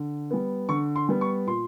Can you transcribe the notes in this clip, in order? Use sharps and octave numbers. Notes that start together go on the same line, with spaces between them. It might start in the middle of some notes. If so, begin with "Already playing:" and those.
Already playing: D3
G3 B3
D3 C#6
C6
G3 B3
C#6
A#2 C6